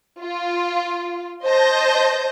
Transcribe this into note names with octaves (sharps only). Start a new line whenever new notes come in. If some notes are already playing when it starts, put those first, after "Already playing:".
F4
C5 D#5 A5 G6 A#6